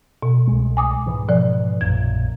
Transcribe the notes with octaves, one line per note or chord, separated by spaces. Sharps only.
B2
C2 G#3
G#5 D6 D#6
G#2 E3
B2 F3 D5
A#1 F#2 A#2 G#6